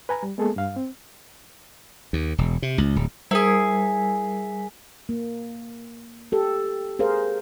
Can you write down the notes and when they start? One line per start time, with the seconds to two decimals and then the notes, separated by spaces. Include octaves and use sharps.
0.09 B4 G#5 A#5
0.23 G3
0.38 G#3 A#3 B3 G#4 A4
0.56 G2 F5
0.76 C4
2.13 D#2
2.38 E1
2.62 C3
2.78 C#2
2.96 D1
3.31 G3 E4 G#4 A#4 B6
5.09 A#3
6.32 G4 A4
6.99 G#4 A#4 C5 F5